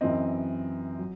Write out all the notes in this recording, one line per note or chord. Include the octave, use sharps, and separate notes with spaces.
F#2 E3 C4 D#5
F#3